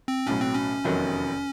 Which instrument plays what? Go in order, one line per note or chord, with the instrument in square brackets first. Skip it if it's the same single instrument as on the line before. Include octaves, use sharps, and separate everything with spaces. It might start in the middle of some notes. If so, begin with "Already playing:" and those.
[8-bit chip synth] C4
[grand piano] B1 A2 F#3 [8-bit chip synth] C#4
[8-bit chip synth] C4
C#4
[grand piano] F1 E2 C3 D#3 F#3